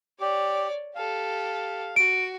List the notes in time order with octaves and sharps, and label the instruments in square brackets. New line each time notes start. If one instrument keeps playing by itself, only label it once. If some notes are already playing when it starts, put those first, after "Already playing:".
[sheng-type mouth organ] G4 [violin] C#5 D5
[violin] G4 A4 [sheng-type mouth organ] F5
[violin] F#4 [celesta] D7